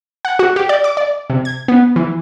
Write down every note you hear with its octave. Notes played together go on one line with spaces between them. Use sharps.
F#5
F#4
G4
D5
D6
D5
C3
G#6
B3
E3